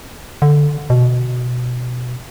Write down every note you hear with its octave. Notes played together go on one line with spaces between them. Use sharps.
D3
B2